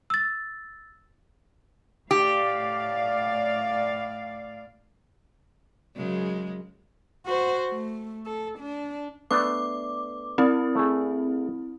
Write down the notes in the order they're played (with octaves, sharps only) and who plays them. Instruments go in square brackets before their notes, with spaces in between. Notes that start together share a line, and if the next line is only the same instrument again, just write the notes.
[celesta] E6 A6
[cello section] A2 D5 F5 [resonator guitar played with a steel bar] G4
[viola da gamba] F#2 C#3 G#3
[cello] F#4 C5
A3
A4
D4
[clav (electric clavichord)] A3 B3 D4 [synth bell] D6
[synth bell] C4 E4
[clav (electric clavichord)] A3 G#4